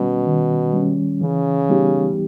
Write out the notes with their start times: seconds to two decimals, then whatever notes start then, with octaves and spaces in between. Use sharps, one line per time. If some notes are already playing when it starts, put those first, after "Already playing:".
Already playing: B2 D#3 G3 C#4
0.27 D#3
0.74 G3 C#4
1.21 C#3 E3
1.69 G3 B3 D#4 G4